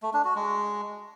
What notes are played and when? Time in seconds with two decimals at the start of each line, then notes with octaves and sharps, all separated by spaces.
0.03 A3
0.14 D4
0.25 F#4
0.36 G#3